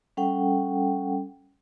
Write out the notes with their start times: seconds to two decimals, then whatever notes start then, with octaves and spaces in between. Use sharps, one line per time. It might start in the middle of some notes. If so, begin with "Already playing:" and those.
0.17 G3 C#4 A4 F#5 G5